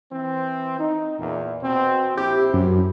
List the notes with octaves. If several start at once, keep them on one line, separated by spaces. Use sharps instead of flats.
E3 C4
D#4
E2 A#2
B2 C4
A#1 C4 E4 G4
F#2